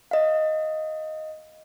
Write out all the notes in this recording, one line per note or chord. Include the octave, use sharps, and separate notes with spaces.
D#5 F5